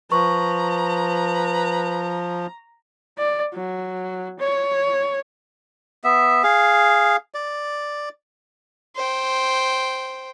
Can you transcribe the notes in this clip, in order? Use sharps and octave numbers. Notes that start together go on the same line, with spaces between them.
F3 B4 A#5 C#6
D5
F#3
C#5
B3 E5
G#4 F5
D5
C5 G5